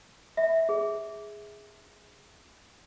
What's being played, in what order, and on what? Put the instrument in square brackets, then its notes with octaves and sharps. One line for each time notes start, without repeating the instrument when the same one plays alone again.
[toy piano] E5
G#4